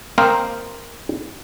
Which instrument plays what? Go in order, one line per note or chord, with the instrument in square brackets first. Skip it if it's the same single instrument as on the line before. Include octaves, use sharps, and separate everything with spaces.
[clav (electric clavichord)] A#3 C4 A#4 C5 D#5 F5